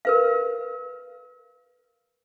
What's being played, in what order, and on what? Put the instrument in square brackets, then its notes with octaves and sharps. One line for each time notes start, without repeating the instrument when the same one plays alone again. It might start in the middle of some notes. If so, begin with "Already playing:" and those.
[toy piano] A#4 B4 F5